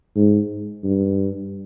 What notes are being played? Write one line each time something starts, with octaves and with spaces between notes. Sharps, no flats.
G#2
G2